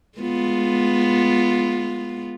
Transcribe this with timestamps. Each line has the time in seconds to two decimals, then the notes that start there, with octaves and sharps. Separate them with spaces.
0.19 G#3 B3 F4